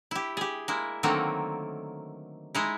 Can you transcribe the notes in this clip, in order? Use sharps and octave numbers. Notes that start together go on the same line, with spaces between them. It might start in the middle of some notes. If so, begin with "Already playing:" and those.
E4 G4
G4 G#4
G#3 A#3 E4
D3 D#3 F#3 A3 A#3 C4
G#3 D#4 E4